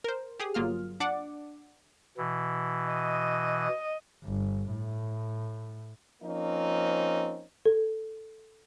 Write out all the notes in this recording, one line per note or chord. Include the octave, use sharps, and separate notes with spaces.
A#4 C5
G4 G#4 D#6
G1 F#3 A#3 F4 F6
D4 D5 F#5 D6
B2 E3
D#5
G1
A2
F3 A#3 C4 C#4 D#4
A4